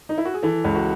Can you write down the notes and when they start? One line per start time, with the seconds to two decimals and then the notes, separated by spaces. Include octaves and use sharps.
0.09 D#4
0.18 E4
0.25 F#4
0.34 G#4
0.43 E3 A4
0.64 C#2
0.75 F#4